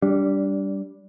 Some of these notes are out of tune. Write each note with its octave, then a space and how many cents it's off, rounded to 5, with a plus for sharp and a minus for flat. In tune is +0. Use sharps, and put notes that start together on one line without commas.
G3 +0 D4 -20